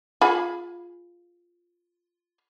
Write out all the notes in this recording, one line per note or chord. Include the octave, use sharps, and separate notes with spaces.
F4 G#4 B5